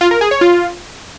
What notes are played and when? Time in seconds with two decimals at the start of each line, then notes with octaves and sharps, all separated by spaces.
0.01 F4
0.11 A#4
0.21 G#4
0.31 C#5
0.41 F4